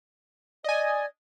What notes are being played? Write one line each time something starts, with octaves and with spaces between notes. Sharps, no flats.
D5 D#5 G#5